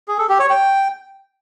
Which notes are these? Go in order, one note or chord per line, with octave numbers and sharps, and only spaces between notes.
G#4
A4
G4
C#5
G5